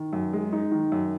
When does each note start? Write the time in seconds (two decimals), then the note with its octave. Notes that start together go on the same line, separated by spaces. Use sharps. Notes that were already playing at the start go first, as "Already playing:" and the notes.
Already playing: D#3
0.13 F#2
0.33 G#3
0.53 D#4
0.72 D#3
0.92 F#2